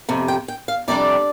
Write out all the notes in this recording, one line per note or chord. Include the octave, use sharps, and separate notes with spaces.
F2 C3
G5
G5
F5
F2 C3 G3 D4 D5